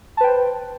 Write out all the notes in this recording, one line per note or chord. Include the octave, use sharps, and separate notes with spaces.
B4 C5 G5 A5